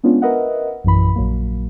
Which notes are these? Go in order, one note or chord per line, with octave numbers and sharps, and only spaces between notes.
G#3 B3 C#4 D4 F4
A#4 B4 D#5 E5 F#5
A#1 F#2 E3 B5
A#1 F#3 A#3